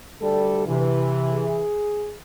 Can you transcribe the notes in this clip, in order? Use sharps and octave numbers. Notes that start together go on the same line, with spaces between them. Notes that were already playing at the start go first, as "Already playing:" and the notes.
D2 G3 A4
C3 E3
G#4